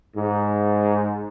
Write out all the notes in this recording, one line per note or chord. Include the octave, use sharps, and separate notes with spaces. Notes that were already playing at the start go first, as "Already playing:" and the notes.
G#2